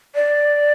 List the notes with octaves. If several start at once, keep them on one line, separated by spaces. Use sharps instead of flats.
D5